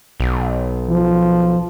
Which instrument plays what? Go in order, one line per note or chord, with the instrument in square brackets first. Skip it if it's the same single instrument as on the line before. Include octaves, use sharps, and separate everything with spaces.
[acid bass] B1
[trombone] F3